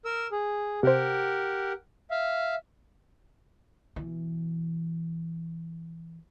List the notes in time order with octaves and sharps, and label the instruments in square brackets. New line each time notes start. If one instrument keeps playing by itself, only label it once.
[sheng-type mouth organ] A#4 E6
G#4
[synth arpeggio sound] C3 C5 [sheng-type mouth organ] G4 A#4 F#5
[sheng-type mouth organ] E5 F5
[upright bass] B2 E3